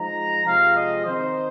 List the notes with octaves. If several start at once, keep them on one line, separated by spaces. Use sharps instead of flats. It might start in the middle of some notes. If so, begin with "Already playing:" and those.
Already playing: F3 G#3 D#4 A#5
C3 F3 G#3 C4 F5
D#5
D#3 C4 D#4 C5